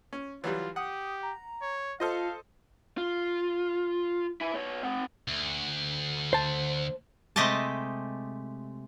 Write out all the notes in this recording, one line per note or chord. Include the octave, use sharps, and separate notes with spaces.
C#4
E3 F#3 G3 F4 C#5
G4 F#5 D#6
A#5
C#5
F4 A4 C5 D#5 F5
F4
E4 G#5
B3 C#5
C4 F#5
D2
C5 A5
C3 G#3 A3 G4 D#5 A5